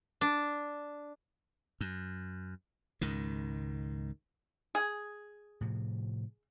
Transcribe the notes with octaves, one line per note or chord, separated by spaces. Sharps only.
D4
F#2
C#2 G#2 D#3
G#4
A2 C3 F3